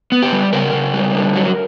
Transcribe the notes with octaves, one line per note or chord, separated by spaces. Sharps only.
B3
G4
G3
C#3 A#4
C#3
G3
D3
F#3